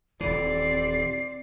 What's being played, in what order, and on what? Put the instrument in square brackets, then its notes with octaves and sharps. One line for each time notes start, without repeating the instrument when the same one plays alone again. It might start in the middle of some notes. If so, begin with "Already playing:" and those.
[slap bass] D#1 E3 [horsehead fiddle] C4 D5 [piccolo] C7